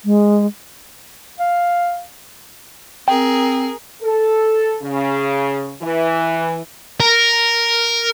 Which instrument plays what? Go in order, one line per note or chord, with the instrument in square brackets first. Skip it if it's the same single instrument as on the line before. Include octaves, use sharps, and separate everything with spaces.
[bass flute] G#3
[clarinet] F5
[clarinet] C4 [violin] G#4 A#4 [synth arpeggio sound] G5
[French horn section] A4
C#3
E3
[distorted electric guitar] A#4